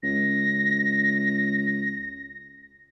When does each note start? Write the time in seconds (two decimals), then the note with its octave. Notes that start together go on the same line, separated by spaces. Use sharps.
0.03 C#2 A#6